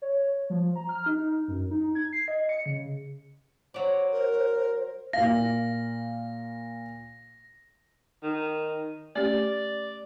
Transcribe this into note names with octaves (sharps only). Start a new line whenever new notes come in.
C#5
F3
A#5
F6
D#4
F#2
D#4
G#6
C7
D#5
C#7
C#3
F#3 C5 D5
A#4
A#2 F5 A#6
D#3
A3 C#4 G4 D5